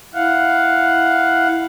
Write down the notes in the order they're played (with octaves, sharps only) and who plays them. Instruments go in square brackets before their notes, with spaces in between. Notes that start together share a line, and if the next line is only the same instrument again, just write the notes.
[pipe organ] E4 F5 F#5